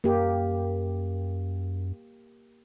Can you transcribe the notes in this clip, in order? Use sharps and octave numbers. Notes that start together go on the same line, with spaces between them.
F#2 A#3 G4